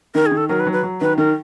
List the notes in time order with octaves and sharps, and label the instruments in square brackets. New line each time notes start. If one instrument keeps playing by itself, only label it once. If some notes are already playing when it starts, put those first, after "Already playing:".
[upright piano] D#3 [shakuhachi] A#4
[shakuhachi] G#4
[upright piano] D#3
[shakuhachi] A4
[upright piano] F#3 [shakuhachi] A#4
[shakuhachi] B4
[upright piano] F#3
[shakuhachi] B4
[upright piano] F#3
[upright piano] D#3 [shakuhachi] B4
[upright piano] D#3 [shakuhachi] A#4